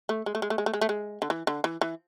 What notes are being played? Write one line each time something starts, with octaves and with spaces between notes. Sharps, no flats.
A3
G#3
A3
G#3
A3
G#3
A3
G#3
A3
G#3
D3
E3
D3
E3
E3